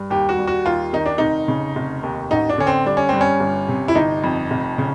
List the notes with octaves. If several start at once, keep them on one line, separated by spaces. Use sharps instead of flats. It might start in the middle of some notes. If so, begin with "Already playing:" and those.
Already playing: G2
D#2 G4
F#4
G3
F#4
D#2 F4
D#3 D#4
D4
F1 D#4
C#3
F1
D#2
A1 D#4
D4
D3 C#4
C4
G3 D4
C#4
G2 C4
C#4
G1
C3
E4
G1 D#4
F2
F1
C#3